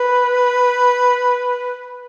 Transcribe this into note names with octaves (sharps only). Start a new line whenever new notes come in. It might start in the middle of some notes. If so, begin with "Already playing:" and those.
Already playing: B4